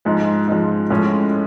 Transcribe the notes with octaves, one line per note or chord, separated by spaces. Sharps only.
G#2 F3 G#3
G#2 F3 G#3
A2 F3 G#3 C#4